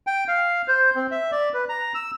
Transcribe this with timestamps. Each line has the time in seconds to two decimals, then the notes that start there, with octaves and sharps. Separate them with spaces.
0.07 G5
0.28 F5
0.68 C5
0.95 C4
1.11 E5
1.32 D5
1.54 B4
1.69 A#5
1.95 E6